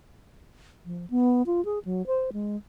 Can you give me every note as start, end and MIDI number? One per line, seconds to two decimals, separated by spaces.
0.85 1.06 53
1.10 1.42 59
1.46 1.63 65
1.65 1.79 68
1.85 2.05 54
2.06 2.30 72
2.32 2.57 56